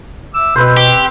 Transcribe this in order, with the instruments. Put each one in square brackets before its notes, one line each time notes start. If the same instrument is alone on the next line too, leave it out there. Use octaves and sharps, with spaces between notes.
[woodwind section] E5 D6 E6
[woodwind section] B2 [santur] C4 B4 C5
[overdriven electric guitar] G4